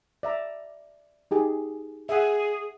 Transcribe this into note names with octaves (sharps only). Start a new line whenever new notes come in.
D5 E5 A#5
D#4 G4 G#4
G#4 E5 F#5